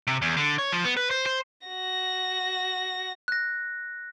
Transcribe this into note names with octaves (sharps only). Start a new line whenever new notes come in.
C3
E2
D3
C#5
F3
B3
B4
C5
C5
F#4 A#6
F#6 A#6